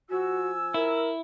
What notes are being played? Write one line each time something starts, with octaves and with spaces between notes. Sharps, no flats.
F3 F#4 G#5 E6
E4 A#4